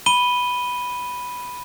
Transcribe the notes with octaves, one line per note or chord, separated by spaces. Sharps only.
B5 D#7 G7